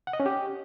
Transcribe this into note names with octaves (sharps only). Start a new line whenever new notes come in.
F#5
D#5
C#4
G4